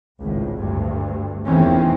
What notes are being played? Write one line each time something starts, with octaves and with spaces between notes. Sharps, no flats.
G#1 C#2 A2
D2 G2
F1 E2 D#3 E3 C4 C#4